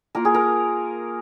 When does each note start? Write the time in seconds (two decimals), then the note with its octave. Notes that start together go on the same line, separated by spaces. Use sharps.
0.15 A#3 F4 A#4
0.25 G#4
0.34 A#4